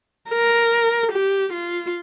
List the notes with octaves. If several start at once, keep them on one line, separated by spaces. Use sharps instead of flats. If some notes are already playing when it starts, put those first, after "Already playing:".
A#4
G4
F4